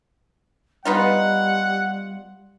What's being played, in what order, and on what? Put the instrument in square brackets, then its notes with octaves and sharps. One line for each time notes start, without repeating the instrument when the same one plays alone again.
[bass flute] G3 [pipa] B3 D#4 F4 [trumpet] F#5